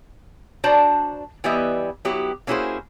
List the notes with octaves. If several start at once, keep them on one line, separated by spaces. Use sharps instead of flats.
D4 F#4 C5 D5 A5 A#5
E3 G3 B3 G4 D#5 E5
F#3 B3 E4 G4
A#3 C#4 E4 F#4 G#4 C5